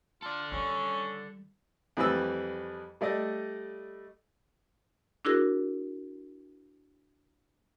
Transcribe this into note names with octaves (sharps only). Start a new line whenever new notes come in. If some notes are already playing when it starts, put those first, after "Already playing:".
F4 A4 D5
D#3 G3 C#4
F2 E3 G3 B4 E6
G3 A3 D5 D#5
D4 E4 F#4 G#4 A#4